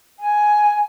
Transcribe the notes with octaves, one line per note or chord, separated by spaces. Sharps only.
G#5